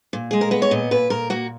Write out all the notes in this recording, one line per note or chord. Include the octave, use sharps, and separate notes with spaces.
A#2
G#3 G#4
A#4
B3 B4
C#5
A#2 D#5
A#2 B4
A#2 A#4
A#3 F#4